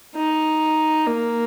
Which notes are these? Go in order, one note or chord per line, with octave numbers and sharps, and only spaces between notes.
D#4
A#3